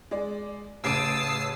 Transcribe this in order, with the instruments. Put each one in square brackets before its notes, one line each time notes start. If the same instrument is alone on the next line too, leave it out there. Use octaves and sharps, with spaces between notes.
[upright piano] G#3 D5
[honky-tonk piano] A1 D7 [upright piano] C#3 [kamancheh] A5 D#6 [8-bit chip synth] E6 C7